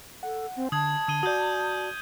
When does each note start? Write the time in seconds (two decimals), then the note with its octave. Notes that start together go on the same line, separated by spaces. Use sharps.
0.23 A4 F#5
0.56 C4
0.72 D3 A5 D#6 G#6
1.08 D3 D#6 D#7 G7
1.23 F#4 D5 D#6 G6